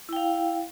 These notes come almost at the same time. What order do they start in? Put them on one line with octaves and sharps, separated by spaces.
E4 G5 F5